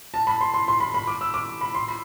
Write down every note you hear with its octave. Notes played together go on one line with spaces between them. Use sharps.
A5
B5
C6
C6
C6
B5
B5
D6
E6
D6
B5
C6
B5